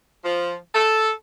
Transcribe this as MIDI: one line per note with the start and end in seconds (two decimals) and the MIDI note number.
0.23 0.55 53
0.74 1.10 69